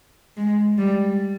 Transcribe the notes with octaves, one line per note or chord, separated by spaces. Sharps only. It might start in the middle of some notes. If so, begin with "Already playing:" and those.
G#3
G3